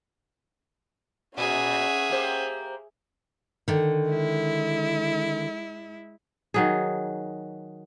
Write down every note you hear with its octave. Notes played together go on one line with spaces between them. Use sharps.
A#2 C#4 G#4 E5 F#5
A#3 G4 C5
D3 D#3
G#3 E4
D#3 F#3 G#4